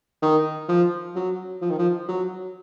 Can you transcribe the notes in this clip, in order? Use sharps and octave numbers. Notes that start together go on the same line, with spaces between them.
D#3
F3
F#3
F3
D#3
F3
F#3